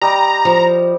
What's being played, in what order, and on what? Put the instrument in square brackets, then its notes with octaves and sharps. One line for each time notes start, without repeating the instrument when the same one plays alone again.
[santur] G3 D#5 G5 [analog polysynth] A#5
[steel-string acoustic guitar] F3